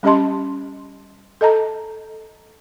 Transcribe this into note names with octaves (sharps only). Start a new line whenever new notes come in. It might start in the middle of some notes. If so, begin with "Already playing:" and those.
G3 C#4 G4 D#5 A5 C6
A4 D#5 A5 A#5